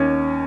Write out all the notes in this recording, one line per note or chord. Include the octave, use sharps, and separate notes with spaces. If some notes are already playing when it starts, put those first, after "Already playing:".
Already playing: D#2 C#4